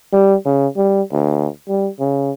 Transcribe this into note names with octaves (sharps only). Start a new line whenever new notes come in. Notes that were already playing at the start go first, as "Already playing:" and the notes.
G3
C#3
G3
D2
G3
C#3